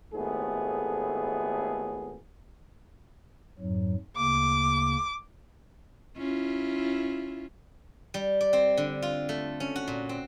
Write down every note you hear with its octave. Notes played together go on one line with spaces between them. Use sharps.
G#1 D#2 A2 A3 B3 G#4
F2 G#2 F#3
D2 C#3 A#3 D6
C#4 E4 F4
G3
D5
C4
D3
F4
A3
C#4
F#4
A#2
C4